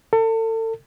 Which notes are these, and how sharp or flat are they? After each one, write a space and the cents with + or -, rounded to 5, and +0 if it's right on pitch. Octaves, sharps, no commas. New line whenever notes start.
A4 +35